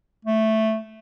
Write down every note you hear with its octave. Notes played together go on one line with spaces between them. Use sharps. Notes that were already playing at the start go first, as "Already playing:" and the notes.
A3